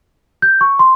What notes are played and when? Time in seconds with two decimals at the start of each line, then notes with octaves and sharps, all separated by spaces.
0.42 G6
0.61 C#6
0.79 C6